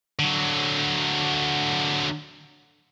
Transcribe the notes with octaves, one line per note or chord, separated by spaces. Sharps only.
D3 F#3